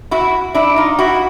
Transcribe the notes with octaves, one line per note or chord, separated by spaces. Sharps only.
E4 F#4
D4 E4
D#4 F4
E4 F#4